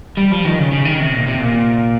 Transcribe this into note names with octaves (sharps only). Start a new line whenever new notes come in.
G3
F3
D#3
C#3
C#3
D#3
C3
A#2
C3
A#2